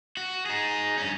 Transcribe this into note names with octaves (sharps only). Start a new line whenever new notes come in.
F#4
D#4 G#4
G2 C#4